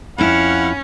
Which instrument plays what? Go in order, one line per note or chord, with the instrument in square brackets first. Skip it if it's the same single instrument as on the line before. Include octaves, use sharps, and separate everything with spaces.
[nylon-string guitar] F2 E4 [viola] C#4 [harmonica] F5 F#5 B5